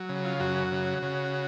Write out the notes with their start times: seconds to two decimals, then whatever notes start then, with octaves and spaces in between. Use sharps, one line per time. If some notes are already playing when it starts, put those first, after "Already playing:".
Already playing: F#3
0.09 C#3
0.25 F4
0.40 F#2 F#4
0.72 C#3
1.03 C#3